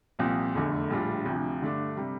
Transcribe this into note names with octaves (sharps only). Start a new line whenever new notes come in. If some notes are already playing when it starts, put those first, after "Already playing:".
C2 A#2 F3 C4
F1 E2 D3 A3
A#1 A2 G3 D4 F4
D2 C3 F3
G2 D3 A3 D4
C3 G3